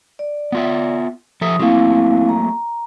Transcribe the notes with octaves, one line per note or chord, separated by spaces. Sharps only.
D5
B3 F4 E5
F3 A4 E5 D#6
F#3 A3 A#3 C4 E4 F5
A#5